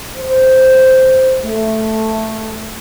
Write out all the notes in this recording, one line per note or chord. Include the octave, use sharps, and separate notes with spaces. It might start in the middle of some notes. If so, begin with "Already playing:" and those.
C5
A3